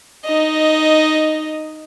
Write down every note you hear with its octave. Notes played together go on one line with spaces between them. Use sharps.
D#4 D#5